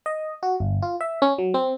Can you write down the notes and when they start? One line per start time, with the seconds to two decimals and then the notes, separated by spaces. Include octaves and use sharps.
0.06 D#5
0.43 F#4
0.60 G1
0.82 F4
1.01 E5
1.22 C#4
1.38 F#3
1.54 C4